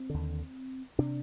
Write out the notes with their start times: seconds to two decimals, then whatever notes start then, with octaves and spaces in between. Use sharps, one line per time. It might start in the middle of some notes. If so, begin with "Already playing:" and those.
Already playing: C4
0.10 D#2 D3
0.99 C3 D4